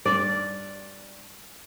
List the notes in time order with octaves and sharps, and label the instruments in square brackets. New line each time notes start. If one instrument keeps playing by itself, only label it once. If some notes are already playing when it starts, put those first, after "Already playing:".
[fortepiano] G2 [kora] D5